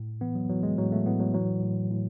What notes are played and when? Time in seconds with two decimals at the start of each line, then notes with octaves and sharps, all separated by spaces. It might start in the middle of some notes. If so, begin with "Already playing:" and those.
Already playing: A2
0.21 E3 B3
0.35 F#3
0.49 E3 F#3
0.63 G#3
0.78 A2 F#3
0.92 A3
1.06 A2 B3
1.20 F#3
1.34 E3 F#3
1.63 A2
1.91 A2